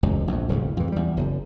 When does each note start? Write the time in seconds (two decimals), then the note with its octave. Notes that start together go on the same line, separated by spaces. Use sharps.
0.03 E1 C#2 F#2
0.28 A#1 F2
0.48 D1 C2 A2 C#3
0.77 F2 G#2 E3
0.92 E2 G3
1.17 F#1 F#2